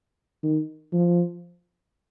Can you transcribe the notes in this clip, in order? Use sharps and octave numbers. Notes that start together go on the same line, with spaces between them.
D#3
F3